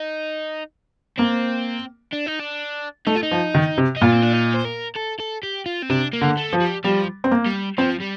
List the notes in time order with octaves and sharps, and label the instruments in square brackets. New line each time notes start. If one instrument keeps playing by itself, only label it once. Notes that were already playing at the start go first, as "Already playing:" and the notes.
Already playing: [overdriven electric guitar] D#4
[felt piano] A#3 [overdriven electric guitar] C4
[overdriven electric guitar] D4
D#4
D4
[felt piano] A3 [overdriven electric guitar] D#4
[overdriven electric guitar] F4
D#4
[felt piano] F3
D#3
C3
[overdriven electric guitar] D#4
[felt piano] A#2 [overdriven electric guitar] F4
[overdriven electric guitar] C4
D4
D#4
C5
A#4
A4
A4
G4
F4
C4
[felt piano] C3 [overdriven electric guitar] D4
[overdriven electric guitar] A#3
[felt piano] D3
[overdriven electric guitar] A3
[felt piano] F3
[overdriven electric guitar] G3
[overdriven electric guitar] F3 [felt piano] G3
[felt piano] C4
A#3
[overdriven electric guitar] G3
[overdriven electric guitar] F3 [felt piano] C4
[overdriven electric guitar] G3